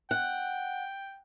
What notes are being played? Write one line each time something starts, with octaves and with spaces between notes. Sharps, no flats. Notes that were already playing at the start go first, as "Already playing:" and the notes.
F#5 G5